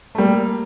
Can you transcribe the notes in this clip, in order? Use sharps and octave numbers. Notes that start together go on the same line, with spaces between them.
A3
G3 A#3